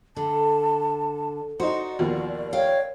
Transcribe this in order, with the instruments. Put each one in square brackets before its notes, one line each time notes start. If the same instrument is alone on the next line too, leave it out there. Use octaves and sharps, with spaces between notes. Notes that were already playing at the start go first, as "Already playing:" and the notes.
[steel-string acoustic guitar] D3 [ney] A5
[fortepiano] D#4 C5 [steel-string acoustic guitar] F#4 [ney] D5
[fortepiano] D#2 B2 F3
[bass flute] C#5 [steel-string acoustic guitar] F5 G5